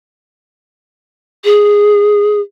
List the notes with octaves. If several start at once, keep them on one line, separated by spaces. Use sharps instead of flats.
G#4